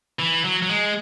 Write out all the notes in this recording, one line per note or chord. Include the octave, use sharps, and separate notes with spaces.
E3
F#3
F#3
G#3